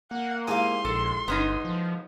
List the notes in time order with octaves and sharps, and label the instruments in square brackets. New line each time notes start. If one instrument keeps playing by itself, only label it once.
[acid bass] A#3 [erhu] F#5
[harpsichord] G#2 E4 G4 [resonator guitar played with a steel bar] F5 G#5 [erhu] C6
[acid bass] A#1 [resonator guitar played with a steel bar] A4
[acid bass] G1 [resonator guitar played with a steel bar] B3 C#4 D#4
[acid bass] F3